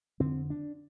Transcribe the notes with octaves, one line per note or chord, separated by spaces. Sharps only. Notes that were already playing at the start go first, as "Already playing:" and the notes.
F2 D3 C4
D4